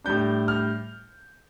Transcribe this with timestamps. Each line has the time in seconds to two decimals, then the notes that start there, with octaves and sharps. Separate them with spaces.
0.04 A2 G3 D4 G6
0.48 F6